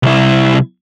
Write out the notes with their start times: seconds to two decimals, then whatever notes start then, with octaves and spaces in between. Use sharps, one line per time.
0.03 C2 E4